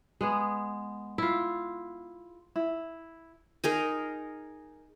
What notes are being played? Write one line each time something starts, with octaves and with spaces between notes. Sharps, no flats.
G#3 B3 G#4
E4 F4
E4
D#4 G#4 A#4